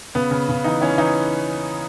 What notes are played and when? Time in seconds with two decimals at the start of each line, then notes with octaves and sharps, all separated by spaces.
0.15 C#3 B3
0.31 C#3
0.49 C#3
0.64 E3 D#4
0.81 E3 C#4
0.98 E3 D#4